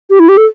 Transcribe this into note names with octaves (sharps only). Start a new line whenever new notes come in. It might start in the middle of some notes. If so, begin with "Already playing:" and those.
G4
E4
G4
A4